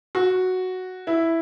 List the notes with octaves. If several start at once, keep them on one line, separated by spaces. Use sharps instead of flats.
F#4
E4